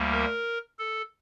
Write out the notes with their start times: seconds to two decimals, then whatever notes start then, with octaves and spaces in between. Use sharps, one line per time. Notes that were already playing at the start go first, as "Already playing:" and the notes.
Already playing: D2 G3 A#3
0.12 A#4
0.79 A4